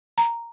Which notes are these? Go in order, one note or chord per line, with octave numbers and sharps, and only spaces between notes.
A#5